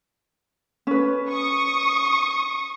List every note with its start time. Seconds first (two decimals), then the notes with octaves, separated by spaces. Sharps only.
0.87 C#4 B4
1.30 C#6 D#6